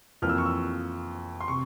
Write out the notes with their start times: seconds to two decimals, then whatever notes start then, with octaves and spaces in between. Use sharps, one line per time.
0.22 F2 E3 A#3 F6
0.29 E6
0.38 C#6
0.46 E6
1.41 C6
1.48 C3 C#6